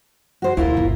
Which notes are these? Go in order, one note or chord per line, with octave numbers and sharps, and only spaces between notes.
F#4 C5
D2 B2 E4 F4 A#4
G1 B2